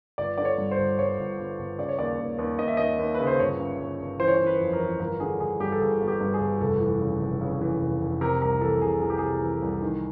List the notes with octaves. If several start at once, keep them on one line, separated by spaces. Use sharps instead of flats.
G1 D5
D3 D5
C#5
G2
C5
G1
G1 C#5
G1
G1
G1
C#3 D5
C#5
D#2 D5
D#2
D#2
D#2 D#5
E5
D#2 D#5
D#2
B4
C#3
C5
G1 C#5
C#3
G1
G1
E3 C5
C#5
E3 C5
B4
F2
A#4
E3
G1 A#4
D3 G#4
G1 G#4
G2 G4
A4
G1 G#4
G1
G4
G2
G#4
G1
F1 A4
E3
C#3
F1
C#3
E3
F1
F1
C3 A#4
C2 A#4
E3 A4
C3 G#4
E3 G#4
G4
C3 G#4
E3
C2
D#3